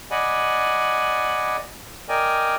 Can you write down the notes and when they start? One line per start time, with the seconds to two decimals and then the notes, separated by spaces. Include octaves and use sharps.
0.11 D5 D#5 F#5 G#5 B5
2.09 A#4 D5 D#5 G5 G#5